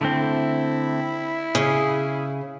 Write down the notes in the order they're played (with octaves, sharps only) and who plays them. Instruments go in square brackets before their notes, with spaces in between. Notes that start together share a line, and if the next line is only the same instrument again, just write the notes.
[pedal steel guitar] D3 A3 C4 [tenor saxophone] E4
[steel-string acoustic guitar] C#3 [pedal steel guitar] G#4